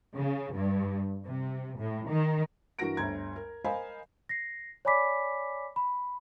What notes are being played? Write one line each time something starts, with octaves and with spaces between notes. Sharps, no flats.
C#3
G2
C3
A2
D#3
G2 E3 F#4 A#4 A#6 D7
G1 D2 A#5 G#6
A#4
A#4 C5 D#5 F5 G#5 B5
A#6 C7
C#5 D5 G#5 B5 D6 B6
B5